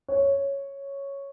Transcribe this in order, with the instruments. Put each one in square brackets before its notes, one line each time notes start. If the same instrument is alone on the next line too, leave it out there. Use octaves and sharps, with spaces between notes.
[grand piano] C#5